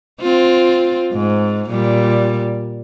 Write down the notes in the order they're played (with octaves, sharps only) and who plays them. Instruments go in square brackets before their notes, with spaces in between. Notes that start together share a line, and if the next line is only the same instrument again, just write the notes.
[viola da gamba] C4 F4
G#2
A#2 G3